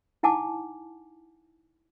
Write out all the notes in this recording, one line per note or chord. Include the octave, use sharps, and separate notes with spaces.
D#4 E4 F#5 G#5 A5 D6